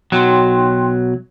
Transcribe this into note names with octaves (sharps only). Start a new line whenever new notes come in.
B1 F#3 D#4 G5 C6